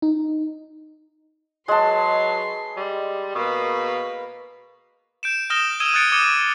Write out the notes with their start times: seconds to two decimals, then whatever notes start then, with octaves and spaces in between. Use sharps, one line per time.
0.02 D#4
1.68 F#3 G#3 B4 A5 C6
2.77 G3
3.35 B2 A#3 B4
5.23 G6 D7 E7
5.50 D#6 F6 G6 A#6 E7 G7
5.80 D#6 E6 G#6 D#7 E7 G7
5.94 D#6 F#6 G#6 A6 C#7 D7
6.12 D6 D#6 C#7 D#7 G7